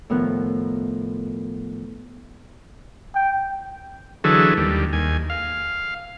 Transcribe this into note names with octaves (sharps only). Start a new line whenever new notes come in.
A2 D#3 F3 B3 A#4 F#6
G5
D3 E3 F#3 G#4 A4
D#2 G3
D#2 G#5
F5